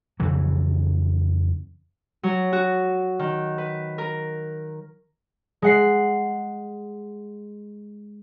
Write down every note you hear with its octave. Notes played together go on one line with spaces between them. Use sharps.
F2 C#3 E3 F#3
F#3
F#4
D#3
B4
A#4
G#3 F#5 C7